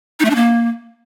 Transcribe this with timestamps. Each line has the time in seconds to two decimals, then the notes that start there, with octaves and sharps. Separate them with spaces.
0.20 D#4
0.25 A3
0.30 D4
0.35 A#3